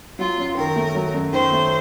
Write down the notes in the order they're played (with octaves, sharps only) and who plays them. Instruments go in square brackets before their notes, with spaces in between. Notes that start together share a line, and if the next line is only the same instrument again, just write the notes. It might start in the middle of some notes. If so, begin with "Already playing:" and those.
[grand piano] F#3 [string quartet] F4
[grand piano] F#2
[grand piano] D#3 [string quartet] A#4
[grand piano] A3
F#3
F#2
[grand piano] D#3 [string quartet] C5
[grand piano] A3